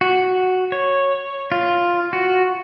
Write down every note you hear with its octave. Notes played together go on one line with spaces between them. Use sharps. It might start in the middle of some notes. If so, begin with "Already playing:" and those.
F#4
C#5
F4
F#4